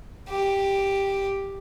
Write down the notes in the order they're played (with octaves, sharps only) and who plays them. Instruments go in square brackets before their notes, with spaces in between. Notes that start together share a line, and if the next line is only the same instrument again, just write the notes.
[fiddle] G4